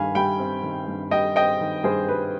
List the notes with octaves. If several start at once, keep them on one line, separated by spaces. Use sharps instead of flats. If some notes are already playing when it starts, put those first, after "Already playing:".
Already playing: G2 D#3 F5 G#5 B5
G3 G5 B5
C4
D#3
G2
G3 D#5 G5
C4 D#5 G5
D#3
G2 G#4 C5
G3 B4